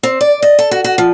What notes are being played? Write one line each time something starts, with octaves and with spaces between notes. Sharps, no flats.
C4
D5
D#5
A4
F#4
F#4
F3